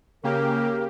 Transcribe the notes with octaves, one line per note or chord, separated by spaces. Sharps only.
C#3 A#3 G4 A#4